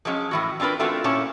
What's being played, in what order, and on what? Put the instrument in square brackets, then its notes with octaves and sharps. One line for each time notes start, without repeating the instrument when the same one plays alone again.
[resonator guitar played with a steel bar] F3 F#3 G#3 C#4
A2 E3 F#4
C4 D4 F4 A#4 B4
A3 C4 D4 F4 F#4
A#2 C#4 E4 C#5 A5